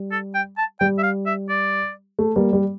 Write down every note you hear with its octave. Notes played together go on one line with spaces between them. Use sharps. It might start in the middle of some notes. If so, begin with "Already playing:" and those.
Already playing: G3
A4
G5
A5
G3 G5
E5
F5
E5
D5
A3
G3 A#3
G3